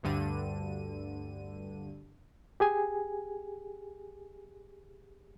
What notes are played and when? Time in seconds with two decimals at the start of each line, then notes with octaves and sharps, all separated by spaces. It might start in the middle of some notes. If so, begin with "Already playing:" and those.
0.03 D2 G2 D3 D#7
2.60 G4 G#4 G#5